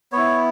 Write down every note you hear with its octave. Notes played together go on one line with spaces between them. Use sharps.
B3 E4 C#5